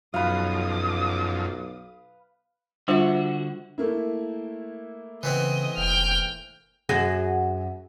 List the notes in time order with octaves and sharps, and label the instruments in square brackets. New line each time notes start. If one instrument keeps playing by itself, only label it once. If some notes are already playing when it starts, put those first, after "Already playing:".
[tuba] B1 [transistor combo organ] F#2 F3 [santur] B4 F5 [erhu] D#6
[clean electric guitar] D3 F#4 [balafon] G3 F4 C5 [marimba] D4 E5
[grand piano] A3 A#3 E4
[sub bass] C#3 [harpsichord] E3 B3 C4 [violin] D#5
[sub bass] F1 [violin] G5 F6
[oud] F#2 F#4 G#4